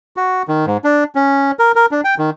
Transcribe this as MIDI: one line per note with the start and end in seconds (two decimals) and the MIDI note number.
0.17 0.43 66
0.48 0.66 51
0.66 0.77 44
0.84 1.04 62
1.15 1.51 61
1.59 1.72 70
1.75 1.86 70
1.91 2.01 62
2.04 2.15 79
2.18 2.30 51